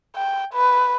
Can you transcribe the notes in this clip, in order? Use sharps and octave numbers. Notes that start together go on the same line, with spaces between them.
G5
B4